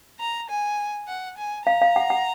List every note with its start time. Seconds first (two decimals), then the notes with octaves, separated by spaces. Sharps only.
0.20 A#5
0.50 G#5
1.08 F#5
1.37 G#5
1.66 F5 A#5
1.82 F5
1.96 F#5
2.10 F#5